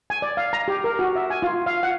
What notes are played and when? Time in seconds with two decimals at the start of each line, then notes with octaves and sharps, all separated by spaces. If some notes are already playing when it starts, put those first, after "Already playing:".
0.10 G#5
0.22 D5
0.37 F5
0.53 A#5
0.68 G4
0.84 A#4
0.99 F#4
1.16 E5
1.30 G#5
1.42 F4
1.66 F5
1.83 F#5